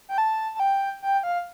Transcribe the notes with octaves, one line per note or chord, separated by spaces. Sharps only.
G5
A5
A5
G5
G5
F5